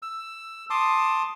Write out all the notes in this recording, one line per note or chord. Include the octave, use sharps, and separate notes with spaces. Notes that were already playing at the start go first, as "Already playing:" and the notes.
E6
A5 C6 D6 D#6